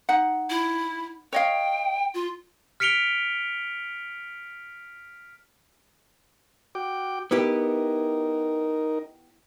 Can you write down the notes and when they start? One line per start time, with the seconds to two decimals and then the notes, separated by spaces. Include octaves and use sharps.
0.09 D#4 F#5
0.50 E4
1.33 C#5 D#5 F5 G5
2.14 F4
2.80 F6 B6 C#7 D7 F7 G7
6.75 F#4 G5 D6
7.31 B3 D#4 E4 G4 A#4 B4